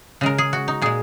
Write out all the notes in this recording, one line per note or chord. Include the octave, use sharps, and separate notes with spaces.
C#3 G#3 A#4
G#4
F#4
D#4
A#2 G#3 G#4